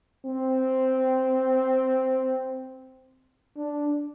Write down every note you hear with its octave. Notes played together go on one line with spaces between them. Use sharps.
C4
D4